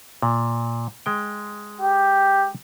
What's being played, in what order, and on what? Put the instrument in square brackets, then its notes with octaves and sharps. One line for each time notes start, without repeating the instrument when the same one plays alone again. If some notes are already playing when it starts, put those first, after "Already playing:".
[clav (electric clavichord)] A#2
G#3 G5
[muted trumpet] G4